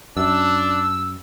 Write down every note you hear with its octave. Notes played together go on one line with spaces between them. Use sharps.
F#2 D4 E6